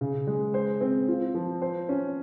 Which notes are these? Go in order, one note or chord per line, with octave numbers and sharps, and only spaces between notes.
C#3
G#3
C5
C4
F4
F3
C5
C#4